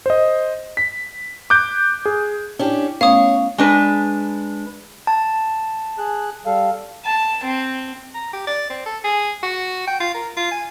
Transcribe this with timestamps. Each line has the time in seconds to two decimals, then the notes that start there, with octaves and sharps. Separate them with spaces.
0.06 C5 D#5
0.77 B6
1.50 D6 F#6 G6 D7
2.05 G#4
2.59 C#4 D4 E4 G4
3.01 A3 B3 C#4 C#5 F5 D#6
3.58 G#3 D4 B4
5.07 A5
5.98 G#4 F#6
6.46 G3 A4 F5
7.05 A5
7.44 C4
8.14 A#5
8.33 G4
8.47 D5
8.70 C4
8.86 A4
9.04 G#4
9.43 F#4
9.87 G5
10.00 F4
10.14 A#4
10.37 F4
10.52 G#5